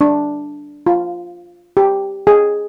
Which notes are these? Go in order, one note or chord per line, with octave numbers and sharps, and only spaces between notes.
D4
F4
G4
G#4